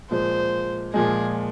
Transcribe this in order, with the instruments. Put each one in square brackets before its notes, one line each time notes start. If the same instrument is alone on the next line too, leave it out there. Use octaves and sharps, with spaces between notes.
[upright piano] A#2 F3 G#3 [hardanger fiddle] C5
[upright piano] A#2 F3 G#3 [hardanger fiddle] G#4